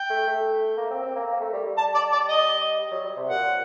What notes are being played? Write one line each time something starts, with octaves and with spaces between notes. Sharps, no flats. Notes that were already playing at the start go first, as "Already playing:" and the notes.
Already playing: G5
A3
A3
A#3
C4
C4
A#3
A#3
A3
G3
G3
A5
D5
D5
D#5
G3
F#3
G3
C3
A#2 F#5